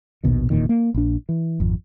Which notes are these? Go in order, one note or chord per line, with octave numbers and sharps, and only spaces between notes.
A#1 D#2 B2 D#3
F1 E2 A#2 D#3
A#3
A#1 D4
E3
G#1 F2